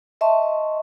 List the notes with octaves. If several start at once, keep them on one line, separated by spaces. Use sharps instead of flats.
D#5 E5 A5 C6 C#6